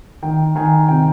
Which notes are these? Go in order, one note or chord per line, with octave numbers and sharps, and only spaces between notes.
D#3 G5
D#3 G#5
C3 G5